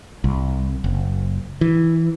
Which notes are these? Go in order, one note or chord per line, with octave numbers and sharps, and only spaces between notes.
C2
F#1
E3